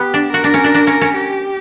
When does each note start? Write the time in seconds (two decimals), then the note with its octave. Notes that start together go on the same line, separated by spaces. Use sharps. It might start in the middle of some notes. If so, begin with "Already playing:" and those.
Already playing: B3 G4
0.14 D4
0.33 F#4 A#4
0.44 D4
0.54 C#4
0.64 D4
0.75 D4
0.87 C#4
1.01 C#4
1.15 G4